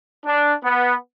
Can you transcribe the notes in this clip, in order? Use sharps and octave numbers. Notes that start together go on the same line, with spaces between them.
D4
B3